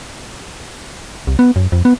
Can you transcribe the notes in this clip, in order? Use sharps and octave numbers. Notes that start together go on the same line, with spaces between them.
C2
B3
F#2
F2
B3